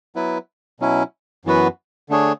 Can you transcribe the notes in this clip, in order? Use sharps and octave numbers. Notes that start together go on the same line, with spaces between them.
F#3 B3 E4 B4
B2 F#3 C#4 E4
F#2 E3 B3 F#4 B4
D3 A3 D4 G#4 C#5